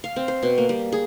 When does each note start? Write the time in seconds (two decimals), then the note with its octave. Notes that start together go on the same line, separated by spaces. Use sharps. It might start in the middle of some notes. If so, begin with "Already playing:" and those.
0.04 F5
0.16 C4
0.28 C5
0.43 B2
0.58 A#3
0.69 G3
0.92 G#4